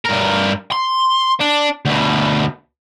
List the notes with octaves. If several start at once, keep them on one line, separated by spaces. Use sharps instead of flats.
G2 A#4
C6
D4
D2 B2